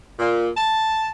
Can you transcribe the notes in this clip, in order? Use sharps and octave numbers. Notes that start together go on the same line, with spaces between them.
A#2
A5